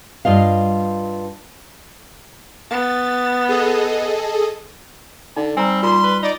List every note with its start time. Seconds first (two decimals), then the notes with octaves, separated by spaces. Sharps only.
0.25 G2 F4 D#5 F5
2.71 B3 A6
3.49 G#4 A4 D#5
5.37 D3 D#4
5.57 G3 C4 G#5 A#5
5.83 A#2 F4 C6
6.03 B4
6.23 D#4 D5